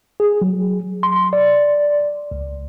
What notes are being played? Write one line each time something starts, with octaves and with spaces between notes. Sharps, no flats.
G#4
F#3
C6
D5
C#2